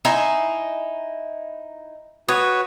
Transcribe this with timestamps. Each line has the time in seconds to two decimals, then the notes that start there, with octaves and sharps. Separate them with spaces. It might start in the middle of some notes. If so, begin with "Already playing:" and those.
0.05 D#4 E4 E5 G#5 C6
2.28 F#4 B4 C#5 D#6